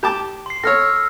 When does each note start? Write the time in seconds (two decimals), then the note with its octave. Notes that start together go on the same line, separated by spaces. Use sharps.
0.03 G4 A5 D6
0.46 C6 C7
0.63 A4 C#5 E6 F6 A#6